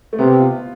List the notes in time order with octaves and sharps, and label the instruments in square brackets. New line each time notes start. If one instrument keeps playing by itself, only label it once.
[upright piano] A3
[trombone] C3 [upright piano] B3
[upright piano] F4